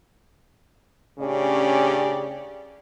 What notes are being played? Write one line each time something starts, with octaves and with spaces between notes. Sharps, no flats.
A2 C#3 C#4 D4 G4 D5